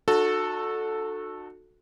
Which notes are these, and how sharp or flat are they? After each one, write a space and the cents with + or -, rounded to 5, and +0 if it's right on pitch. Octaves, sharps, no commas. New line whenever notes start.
D#4 -45 F#4 -20 A4 +0